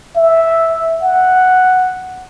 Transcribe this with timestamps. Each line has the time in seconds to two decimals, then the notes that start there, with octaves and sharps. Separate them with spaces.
0.16 E5
1.01 F#5